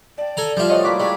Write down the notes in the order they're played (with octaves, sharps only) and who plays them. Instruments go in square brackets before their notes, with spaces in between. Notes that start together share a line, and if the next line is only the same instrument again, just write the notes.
[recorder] D5 [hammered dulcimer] G5 A5
[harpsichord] A4 G#5 A#5
[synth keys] F3 E5 [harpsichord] G3 F4
[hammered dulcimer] F3 A3 F#4 [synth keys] C#5 D#5
[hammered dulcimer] A#3 E4 F#4 [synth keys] D6 B6
[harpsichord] G#3 [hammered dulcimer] G4 A4 C#5 [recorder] D5